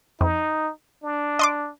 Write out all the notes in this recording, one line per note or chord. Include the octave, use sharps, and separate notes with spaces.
F2 D#4
D4
D#5 C6 D6